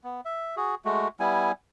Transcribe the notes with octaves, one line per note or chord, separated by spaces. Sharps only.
B3
E5
F#4 G#4
G#3 A3 F#4
G3 B3 E4 G#5